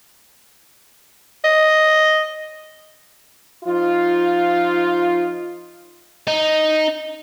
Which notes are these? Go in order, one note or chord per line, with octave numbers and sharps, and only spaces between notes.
D#5
F3 D#4 F4
D#4